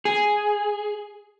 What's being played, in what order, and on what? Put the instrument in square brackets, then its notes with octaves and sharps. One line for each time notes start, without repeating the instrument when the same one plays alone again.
[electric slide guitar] G#4